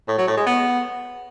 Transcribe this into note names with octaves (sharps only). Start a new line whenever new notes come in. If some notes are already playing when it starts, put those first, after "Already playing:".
A2
F#3
A2
G#3
B3